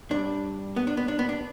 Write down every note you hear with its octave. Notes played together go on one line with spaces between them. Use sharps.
G2 G3 D4
B3
D4
B3
D4
B3
D4